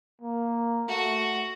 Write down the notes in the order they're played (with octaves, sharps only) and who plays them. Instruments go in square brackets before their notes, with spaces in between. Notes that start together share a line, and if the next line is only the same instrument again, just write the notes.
[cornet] A#3
[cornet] A3 [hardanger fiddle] F#4